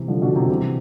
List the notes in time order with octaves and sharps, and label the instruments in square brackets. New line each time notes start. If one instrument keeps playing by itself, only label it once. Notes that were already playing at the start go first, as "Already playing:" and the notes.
Already playing: [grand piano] C3 E3
D3 F3
B2 D3
C3 E3
C3 E3